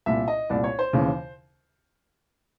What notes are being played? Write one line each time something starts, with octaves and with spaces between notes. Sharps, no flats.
C2 A#2 E5
D#5
C2 A#2 D5
C#5
C5
D#2 C#3 E3